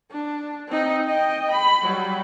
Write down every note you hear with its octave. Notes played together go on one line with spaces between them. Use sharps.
D4
C4 D#4
D#5 G5
B5
F#3 G3